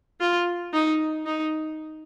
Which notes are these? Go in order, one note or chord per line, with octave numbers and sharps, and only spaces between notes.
F4
D#4
D#4